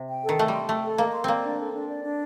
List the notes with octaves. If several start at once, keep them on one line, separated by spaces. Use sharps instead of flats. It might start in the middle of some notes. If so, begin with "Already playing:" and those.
Already playing: C3
G5
A4
D#3
A3 D#5
G3 C6
A3 G5
A4
A#3 D#5
C6
A#3 C4 D5
D4
A4
D4
D5
D4